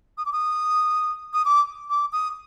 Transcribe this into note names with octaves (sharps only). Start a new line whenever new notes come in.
D#6
D6
D#6
D#6
D6
D6
D#6